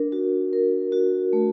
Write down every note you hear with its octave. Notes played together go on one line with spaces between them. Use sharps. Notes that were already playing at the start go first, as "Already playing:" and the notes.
Already playing: D4 A#4
F#4
A#4
F#4
A3